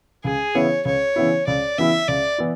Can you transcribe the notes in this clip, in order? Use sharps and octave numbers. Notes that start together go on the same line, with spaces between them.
C#2 G#4
C#3 E3 B3 E4 C#5
C#2 C#5
C#3 E3 B3 E4
C#2 D5
C#3 E3 B3 E4 E5
C#2 D5
E3 B3 E4